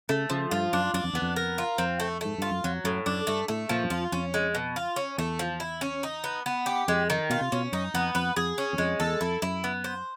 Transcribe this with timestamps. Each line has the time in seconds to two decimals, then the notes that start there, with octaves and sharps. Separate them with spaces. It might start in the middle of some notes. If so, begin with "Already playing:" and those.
0.09 C#3 A3
0.30 C#3 F3
0.51 G2 F4
0.73 F#2 D4
0.94 F#2 D4
1.04 F2
1.13 E2 B3
1.22 F2
1.36 A#4
1.58 F4
1.78 F2 C4
2.00 A3
2.21 G#2 A3
2.38 G2 F4
2.51 F#2
2.64 F2 F#3
2.84 F#2 A2
3.06 F#2 D4
3.27 G2 A3
3.48 A2 A3
3.69 A#2 F3
3.84 F#2
3.90 F2 F4
4.12 F2 C#4
4.34 G#3
4.55 B2
4.76 F4
4.96 C#4
5.18 E2 A3
5.39 F3
5.60 E4
5.81 C#4
6.03 D#4
6.24 B3
6.46 B3
6.66 G4
6.88 F2 G#3
7.10 D#3
7.30 B2 F4
7.41 C3
7.52 B2 C#4
7.72 F#2 D#4
7.94 F2 B3
8.15 F2 B4
8.36 F2 G#4
8.58 C#4
8.73 E2
8.78 F2 G#3
9.00 E2 A4
9.21 F2 E4
9.42 F#2 E4
9.64 B3
9.84 C5